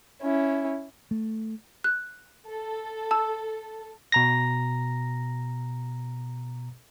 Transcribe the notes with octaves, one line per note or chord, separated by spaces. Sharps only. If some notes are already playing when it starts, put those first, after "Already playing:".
C#4 E4
A3
F#6
A4
A5 E6
B2 A#5 A#6